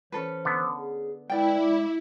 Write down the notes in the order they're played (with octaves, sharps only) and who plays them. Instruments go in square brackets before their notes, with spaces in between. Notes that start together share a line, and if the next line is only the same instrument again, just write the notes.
[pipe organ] E3 C5 [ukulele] C#4 A4 B4
[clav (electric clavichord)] D3 B3
[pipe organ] G#4
[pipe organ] G#3 B4 [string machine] E4 [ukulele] D5 G5
[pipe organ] G#3 E5 D6